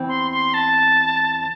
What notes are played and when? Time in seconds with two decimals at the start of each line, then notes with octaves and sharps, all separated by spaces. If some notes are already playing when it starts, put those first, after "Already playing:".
Already playing: E2 E3 C4
0.09 C6
0.31 C6
0.54 A5